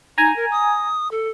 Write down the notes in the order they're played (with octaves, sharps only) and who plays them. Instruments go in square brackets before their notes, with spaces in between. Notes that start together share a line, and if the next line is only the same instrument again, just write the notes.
[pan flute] D#4 [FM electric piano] G#5 A#5
[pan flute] A#4
D#6
A4